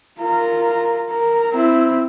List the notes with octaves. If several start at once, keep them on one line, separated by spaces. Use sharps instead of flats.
F4 A#4
A#4
C4 E4